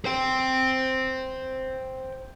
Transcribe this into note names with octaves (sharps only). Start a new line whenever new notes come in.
C5 G5